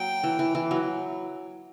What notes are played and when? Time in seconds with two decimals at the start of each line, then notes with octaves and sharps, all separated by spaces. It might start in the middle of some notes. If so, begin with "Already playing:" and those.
Already playing: F#3 A#3 G5
0.24 E3
0.39 E3
0.55 E3
0.71 F#3